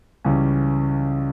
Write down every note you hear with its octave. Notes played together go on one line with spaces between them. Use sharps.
C#2 C#3 E3 G3 C#4